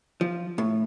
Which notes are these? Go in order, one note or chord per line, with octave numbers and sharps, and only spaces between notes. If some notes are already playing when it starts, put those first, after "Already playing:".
F3
A2